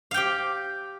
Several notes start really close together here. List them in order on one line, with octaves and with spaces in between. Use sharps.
F5 G5 G4